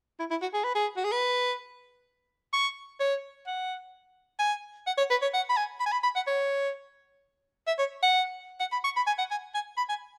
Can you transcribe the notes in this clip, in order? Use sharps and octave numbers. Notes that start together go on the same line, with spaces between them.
E4
E4
F#4
G#4
B4
G#4
F#4
G#4
B4
C#6
C#5
F#5
G#5
F#5
C#5
B4
C#5
F#5
B5
G#5
B5
G#5
B5
B5
F#5
C#5
E5
C#5
F#5
F#5
B5
C#6
B5
G#5
F#5
G#5
G#5
B5
G#5